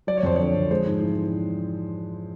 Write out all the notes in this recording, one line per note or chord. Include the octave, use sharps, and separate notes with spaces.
F#3 D5
C#5
F2 C5
D3 C#5
F2
G#3 C5
G#2
E3